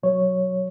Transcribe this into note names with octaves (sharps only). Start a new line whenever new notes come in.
B2 F#3 C#5